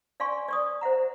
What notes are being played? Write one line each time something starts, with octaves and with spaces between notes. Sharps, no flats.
D5 F5 G#5 C6 C#6
D5 C#6 D#6
C5 E5 F#5 A#5